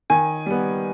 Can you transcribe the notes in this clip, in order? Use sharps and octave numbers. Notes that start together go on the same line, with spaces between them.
D#3 G#5
G3 B3